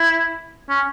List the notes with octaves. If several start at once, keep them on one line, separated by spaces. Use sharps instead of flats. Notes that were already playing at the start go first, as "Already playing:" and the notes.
Already playing: E4
C#4